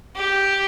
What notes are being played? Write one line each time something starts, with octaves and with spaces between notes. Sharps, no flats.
G4